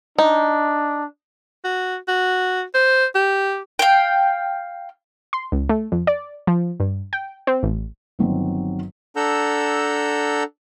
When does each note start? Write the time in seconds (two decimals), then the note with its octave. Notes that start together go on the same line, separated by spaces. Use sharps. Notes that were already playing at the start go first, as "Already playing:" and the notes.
0.18 D4 D#4
1.64 F#4
2.08 F#4
2.75 C5
3.15 G4
3.79 F5 G5
5.33 C6
5.52 C#2
5.69 A3
5.92 F2
6.07 D5
6.47 F3
6.80 G2
7.13 G5
7.47 C4
7.63 A1
8.19 G1 D#3 F#3 C4
9.16 D4 A4 F#5 A#5 E6 G6